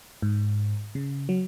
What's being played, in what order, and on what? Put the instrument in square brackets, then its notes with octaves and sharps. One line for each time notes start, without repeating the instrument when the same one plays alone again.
[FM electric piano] G#2
C#3
F#3